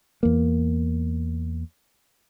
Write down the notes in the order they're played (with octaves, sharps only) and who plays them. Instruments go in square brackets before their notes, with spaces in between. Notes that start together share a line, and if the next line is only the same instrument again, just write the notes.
[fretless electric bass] E2 A#3